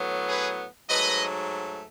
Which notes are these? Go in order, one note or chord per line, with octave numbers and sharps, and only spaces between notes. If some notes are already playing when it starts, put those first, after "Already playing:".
Already playing: A2 F#3 B3
G#4 B4
G#2 F#3 A3 B4 D#5